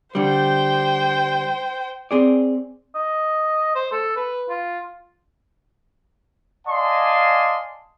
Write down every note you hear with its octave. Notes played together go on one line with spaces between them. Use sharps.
D3 G3 C5 G5
C4 G#4 D5
D#5
C5
A4
B4
F4
D5 D#5 F5 G#5 A5 C6